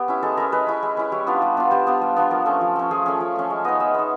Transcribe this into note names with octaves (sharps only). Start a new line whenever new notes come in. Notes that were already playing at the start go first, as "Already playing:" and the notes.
Already playing: B3 G4
C#4 E4
G#3 A4
C#4 E4 A#4
G#3 B4
C#4 E4
G#3
C#4 E4
G3 C#5
B3 D4 F4
G3
B3 D4 F4
G3 C5
B3 D4 F4
G3
B3 D4 F4
F3 A#4
A3 C#4
F3
A3 C#4
F3 G#4
A3 C#4
F3
A3 C#4
G#3
B3 D#4 D#5
G#3 E5
B3 D#4